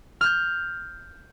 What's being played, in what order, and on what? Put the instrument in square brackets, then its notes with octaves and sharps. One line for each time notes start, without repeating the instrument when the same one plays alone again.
[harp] F6 G6